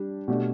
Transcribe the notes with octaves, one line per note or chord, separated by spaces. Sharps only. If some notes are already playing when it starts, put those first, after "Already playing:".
Already playing: G3 D4 G4
B2 A3 D4 G4